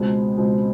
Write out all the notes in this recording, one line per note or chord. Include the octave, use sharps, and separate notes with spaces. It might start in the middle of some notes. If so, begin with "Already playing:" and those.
Already playing: C#2 B2 G#3 C4
C#2 B2 G#3 C4